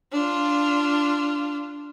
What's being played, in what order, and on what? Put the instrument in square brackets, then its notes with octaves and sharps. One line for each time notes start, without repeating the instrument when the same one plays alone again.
[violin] D4 F4